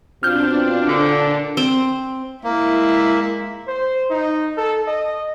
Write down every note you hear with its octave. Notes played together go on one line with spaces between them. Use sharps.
B2 C4 D4 F4 F6 G6
A#2 D3
C4
G#3 A#3 E4
C5
D#4
A4
D#5